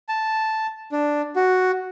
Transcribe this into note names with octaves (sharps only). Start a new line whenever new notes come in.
A5
D4
F#4